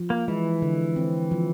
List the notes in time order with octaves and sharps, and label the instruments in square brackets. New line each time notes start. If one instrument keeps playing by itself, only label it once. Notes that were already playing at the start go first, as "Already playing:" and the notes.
Already playing: [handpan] F3
[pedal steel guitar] A#3
[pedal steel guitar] E3 [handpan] G#3
[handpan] D3
C4
F3